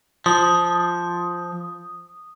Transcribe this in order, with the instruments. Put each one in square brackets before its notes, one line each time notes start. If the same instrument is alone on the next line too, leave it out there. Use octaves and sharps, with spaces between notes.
[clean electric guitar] F3 [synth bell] D#6